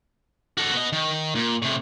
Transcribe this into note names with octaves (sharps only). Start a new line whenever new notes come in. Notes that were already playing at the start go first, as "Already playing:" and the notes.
F#4 A4
B3 D#5
D#3
A#2
A2 C3